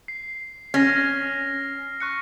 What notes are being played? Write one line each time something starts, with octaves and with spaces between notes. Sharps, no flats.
C7
C#4 F6 A#6
C#6 F#6 C#7